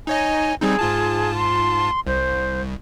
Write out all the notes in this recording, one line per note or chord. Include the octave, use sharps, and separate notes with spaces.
D#4 C#5 D#5 G#5
G3 C4 D#4 G#4
G#2 F4 A5
C6
C2 C5